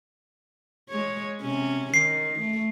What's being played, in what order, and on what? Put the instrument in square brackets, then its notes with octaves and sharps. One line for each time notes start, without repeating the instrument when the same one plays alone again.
[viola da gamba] G#3 C#5
C3 C#4
[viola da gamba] D#3 [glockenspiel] C7
[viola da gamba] A3